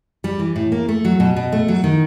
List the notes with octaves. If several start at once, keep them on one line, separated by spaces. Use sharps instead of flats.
G3
E3
A2
A#3
A3
F#3
B2
B2
A3
F#3
D#3